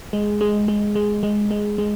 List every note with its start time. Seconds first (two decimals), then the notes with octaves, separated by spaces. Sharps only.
0.13 G#3
0.41 G#3
0.68 G#3
0.95 G#3
1.23 G#3
1.51 G#3
1.78 G#3